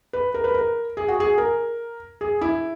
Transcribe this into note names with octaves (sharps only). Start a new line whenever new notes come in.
B4
A#4
B4
A#4
G#4
F#4
G#4
A#4
G#4
E4